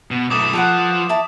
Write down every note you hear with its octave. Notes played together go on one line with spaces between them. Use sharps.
B2
B1 A3 D6 D#6 E7
F3 A4 B4 F#5
E4 A5 B5